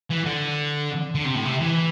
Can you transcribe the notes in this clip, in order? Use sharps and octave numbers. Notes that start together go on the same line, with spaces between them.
E3
D3
D3
C3
A2
C3
E3